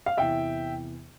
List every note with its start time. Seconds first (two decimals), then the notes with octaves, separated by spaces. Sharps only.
0.06 F5
0.17 E2 C3 E3 E5 G5